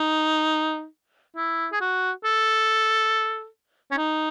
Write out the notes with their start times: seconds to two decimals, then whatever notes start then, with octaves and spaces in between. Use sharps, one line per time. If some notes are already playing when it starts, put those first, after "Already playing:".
Already playing: D#4
1.37 E4
1.72 G#4
1.81 F#4
2.24 A4
3.91 C#4
3.98 D#4